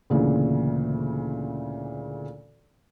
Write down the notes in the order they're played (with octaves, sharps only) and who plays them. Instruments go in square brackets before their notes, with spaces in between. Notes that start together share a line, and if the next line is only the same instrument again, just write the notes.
[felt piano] D2 A#2 C#3 E3